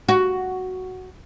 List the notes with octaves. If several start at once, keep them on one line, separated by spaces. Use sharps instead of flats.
F#4